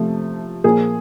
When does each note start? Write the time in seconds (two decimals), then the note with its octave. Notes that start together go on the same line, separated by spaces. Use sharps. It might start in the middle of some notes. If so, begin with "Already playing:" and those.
Already playing: C3 F3 A3
0.64 A#2 F3 A#3 G#4